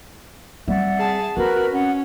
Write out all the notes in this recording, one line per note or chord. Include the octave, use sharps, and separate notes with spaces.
G3 C4 D5 E5 F#5
G#4 A5
C4 F#4 A#4 B4
C#4 F#5